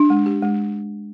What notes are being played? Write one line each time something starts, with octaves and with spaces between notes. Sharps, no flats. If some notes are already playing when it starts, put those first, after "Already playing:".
Already playing: D4
G#3
G4
G#3